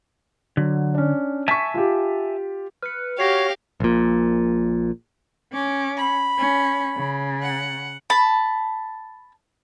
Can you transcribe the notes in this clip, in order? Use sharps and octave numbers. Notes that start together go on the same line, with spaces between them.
D3 F#3
C#4 D4
E5 G#5 A5 C#6 B6
F4 G4
B4 F6 C#7
F#4 G4 C#5 F5 A#6 C7 F7
A#1 A#2
C#4 D6
B5
C#4
C#3
F#5
A5 B5